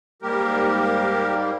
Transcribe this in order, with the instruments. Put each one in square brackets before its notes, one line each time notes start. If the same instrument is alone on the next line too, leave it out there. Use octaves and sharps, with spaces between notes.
[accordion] G#2 G3 A#3 G4 A#4